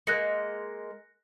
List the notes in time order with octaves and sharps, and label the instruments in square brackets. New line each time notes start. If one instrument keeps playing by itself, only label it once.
[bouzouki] G#3 A#3 [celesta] F#6 A#6 C#7